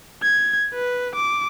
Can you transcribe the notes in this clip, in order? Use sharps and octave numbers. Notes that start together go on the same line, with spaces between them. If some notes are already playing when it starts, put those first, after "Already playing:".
G#6
B4
D6